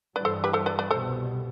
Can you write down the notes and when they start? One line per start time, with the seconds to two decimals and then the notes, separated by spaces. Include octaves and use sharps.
0.16 G2 E3 G3 B4 D5
0.25 A4 C5
0.44 G4 B4
0.53 A4 C5
0.66 B4 D5
0.79 B4 D5
0.91 C2 B2 G3 A4 C5